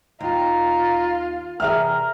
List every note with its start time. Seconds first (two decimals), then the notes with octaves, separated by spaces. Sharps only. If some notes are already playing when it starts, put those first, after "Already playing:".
0.21 D#2 F4 A#5
1.60 E2 C3 G#4 A#4 E5 F6